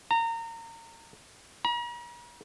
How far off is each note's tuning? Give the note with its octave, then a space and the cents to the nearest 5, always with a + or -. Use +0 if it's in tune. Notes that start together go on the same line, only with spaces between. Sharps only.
A#5 -25
A#5 +45